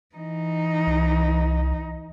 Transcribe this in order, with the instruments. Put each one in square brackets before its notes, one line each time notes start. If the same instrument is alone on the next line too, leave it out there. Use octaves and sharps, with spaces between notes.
[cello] E3 D#4
[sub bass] C2